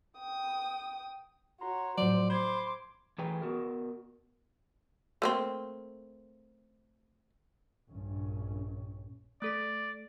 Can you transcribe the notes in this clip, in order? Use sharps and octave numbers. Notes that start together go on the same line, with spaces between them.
G5 D#6
F#4 C#5 A#5 C6
A2 F3 F#3 C5 D5
C5 B5 C6 D6 G#6 C7
E3 A3 G#4 B4 G5 A#5
B3 F#4 A#4
A3 A#3 C4
A#1 G2 C#4
A3 A4 D5 B6